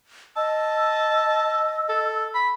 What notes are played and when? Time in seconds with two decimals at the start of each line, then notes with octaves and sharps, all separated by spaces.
0.36 D#5 A5 E6
1.89 A4
2.35 B5